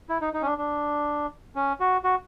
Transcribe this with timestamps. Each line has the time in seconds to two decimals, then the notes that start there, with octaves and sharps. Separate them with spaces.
0.09 E4
0.21 D#4
0.33 D#4
0.42 C#4
0.45 D4
0.58 D4
1.56 C#4
1.80 F#4
2.04 F#4